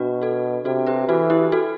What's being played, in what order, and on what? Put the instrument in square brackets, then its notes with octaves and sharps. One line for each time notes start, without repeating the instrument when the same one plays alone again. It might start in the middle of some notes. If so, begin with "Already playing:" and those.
Already playing: [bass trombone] B2 [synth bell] D4 F#4
[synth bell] F#4 A4
[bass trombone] C3 [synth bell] F#4 A4
[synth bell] G4 B4
[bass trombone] E3 [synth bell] F#4 A4
[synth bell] E4 G4
F#4 A4